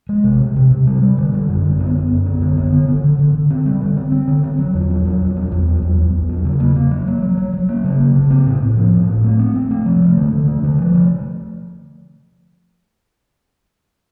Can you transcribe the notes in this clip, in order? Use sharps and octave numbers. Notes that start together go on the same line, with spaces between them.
G#3
C3
C3
C3
C3
G3
G3
D3
D3
F#2
D3
B3
B3
F#2
B3
D3
B3
D3
D3
D3
D3
D3
C4
G3
D3
C4
C4
D3
C4
F#3
E2
F#3
F#3
E2
F#3
E2
F#3
E2
E2
E2
F#3
C#3
A#3
A#3
F#3
F#3
F#3
F#3
F#3
A#3
C#3
A#3
C#3
C4
A2
A2
F3
A2
C4
A3
C4
C4
A3
F3
A3
D3
D3
A3
D3
F3
A3